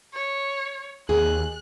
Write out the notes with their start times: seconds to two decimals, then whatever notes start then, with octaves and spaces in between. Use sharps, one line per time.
0.14 C#5
1.09 D#2 G#4 F#6